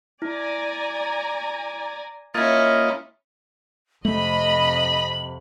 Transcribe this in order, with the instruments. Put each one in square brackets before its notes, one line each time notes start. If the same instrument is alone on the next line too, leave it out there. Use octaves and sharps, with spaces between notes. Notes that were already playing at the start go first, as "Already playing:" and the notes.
[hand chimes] E4 [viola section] D5 G#5 A#5
[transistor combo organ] A#3 F4 D#5 [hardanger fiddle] C#4 E4 [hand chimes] F6 G#6 A6
[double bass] F2 C3 [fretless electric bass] A3 [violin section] D#5 B5 [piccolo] F#7